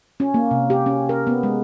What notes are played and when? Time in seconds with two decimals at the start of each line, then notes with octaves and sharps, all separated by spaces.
0.20 C#4
0.34 A#3
0.51 C3
0.70 G4
0.86 C#4
1.09 A#4
1.27 B3
1.43 G#3